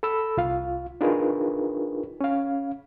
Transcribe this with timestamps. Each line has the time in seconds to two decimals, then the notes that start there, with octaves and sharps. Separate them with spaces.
0.03 A4 B5 E6
0.37 C2 F4 F5
1.01 D4 D#4 F4 G#4 A#4 B4
2.21 C#4 F5